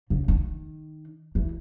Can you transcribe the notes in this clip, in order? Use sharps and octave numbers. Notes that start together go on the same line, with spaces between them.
C#3
D#3
E3